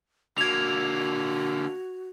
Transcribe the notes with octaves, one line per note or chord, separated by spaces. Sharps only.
D3 A#3 F#4 G#6 F7